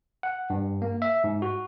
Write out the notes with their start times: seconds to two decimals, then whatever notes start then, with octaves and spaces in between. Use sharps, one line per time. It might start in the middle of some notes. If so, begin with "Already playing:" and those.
0.23 F#5
0.50 G2
0.82 A#3
1.02 E5
1.24 G#2
1.42 F#4